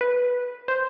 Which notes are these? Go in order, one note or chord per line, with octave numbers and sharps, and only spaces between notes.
B4
C5